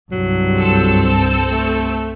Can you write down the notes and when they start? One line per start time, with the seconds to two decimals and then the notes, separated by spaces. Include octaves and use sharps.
0.12 C2 G2 F#3
0.56 C4 A4 E6
1.52 A3